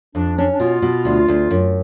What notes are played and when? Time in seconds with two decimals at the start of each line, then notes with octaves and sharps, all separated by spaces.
0.15 F2 D4
0.37 C#4 D4
0.53 D4
0.60 B2 F4
0.82 B2
1.05 D2
1.28 D2
1.51 F#2